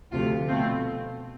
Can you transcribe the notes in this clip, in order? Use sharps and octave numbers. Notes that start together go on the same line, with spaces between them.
D2 C3 F3 A3 F4
B2 A3 C4 F4